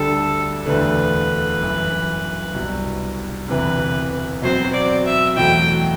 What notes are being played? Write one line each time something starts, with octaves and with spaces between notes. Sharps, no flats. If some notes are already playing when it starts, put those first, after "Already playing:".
Already playing: D2 D3 G3 D4 A4
E1 D2 D3 A3 B4
G1 F#2 E3
C2 B2 G3
E1 D2 C3 E3 B4
B2 F#3 C4 C5
D5
E5
E2 B2 F#3 A3 G5